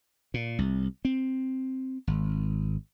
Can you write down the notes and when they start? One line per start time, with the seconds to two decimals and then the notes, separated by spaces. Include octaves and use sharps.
0.34 A#2
0.59 C2
1.05 C4
2.07 G#1